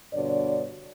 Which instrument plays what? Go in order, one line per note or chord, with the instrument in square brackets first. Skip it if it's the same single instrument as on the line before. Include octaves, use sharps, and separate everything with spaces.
[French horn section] G2 B2 D3 C#5 D5